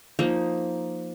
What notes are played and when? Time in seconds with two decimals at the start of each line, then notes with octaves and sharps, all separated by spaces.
0.19 F3 A#3 D#4